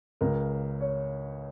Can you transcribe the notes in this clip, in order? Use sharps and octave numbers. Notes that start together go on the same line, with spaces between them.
C#2 C#3 A#4
C#5